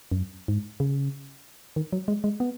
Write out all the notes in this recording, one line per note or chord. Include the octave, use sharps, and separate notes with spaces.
F#2
G#2
C#3
D#3
F#3
G#3
G#3
B3